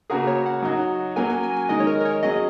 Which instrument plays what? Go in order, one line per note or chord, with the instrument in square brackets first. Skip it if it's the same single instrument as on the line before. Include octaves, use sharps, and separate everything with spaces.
[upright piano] C#3 A#3 F#4 A#4 [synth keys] G#4
[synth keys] C#5
F#5
[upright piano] F#3 D#4 F#4
[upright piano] F#3 A#3 C#4 F#4 A#4 [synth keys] G#5
[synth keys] G#5
G#5
G#5
[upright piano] D#3 G#3 D#4 [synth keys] D#5
[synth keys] C#5
A#4
A#4
C#5
[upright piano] F#3 C#4 G#4 [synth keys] D#5